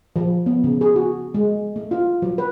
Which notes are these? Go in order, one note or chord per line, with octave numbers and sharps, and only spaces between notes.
F3
B3
C#3
G#4
F#4
G#3
A3
F4
F#3
B4